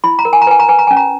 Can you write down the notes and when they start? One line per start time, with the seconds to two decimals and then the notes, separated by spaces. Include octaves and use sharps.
0.04 E4 B5
0.19 A#5
0.25 A#4
0.33 G#5
0.41 A#5
0.47 B4 G#5
0.60 A#5
0.68 B4 G#5
0.79 A#5
0.87 C#4 G#5
0.97 A#5